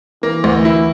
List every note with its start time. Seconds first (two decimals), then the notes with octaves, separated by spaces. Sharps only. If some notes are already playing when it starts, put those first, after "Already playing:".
0.23 E3 A#3
0.44 D2
0.65 E4